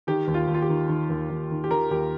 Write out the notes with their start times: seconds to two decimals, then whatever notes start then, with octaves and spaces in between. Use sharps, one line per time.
0.07 D#3 G4
0.27 D#2
0.34 F4
0.47 D#2
0.54 F4
0.62 G4
0.69 D#3
0.88 D#3
1.10 D#2
1.30 D#2
1.50 D#3
1.64 G4
1.70 D#3 A#4
1.91 D#2 G4